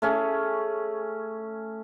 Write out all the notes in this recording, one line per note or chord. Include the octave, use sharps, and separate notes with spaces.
A3 C#4 G#4